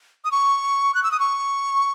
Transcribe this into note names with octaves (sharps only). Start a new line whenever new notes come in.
D#6
C#6
F#6
E6
D#6
C#6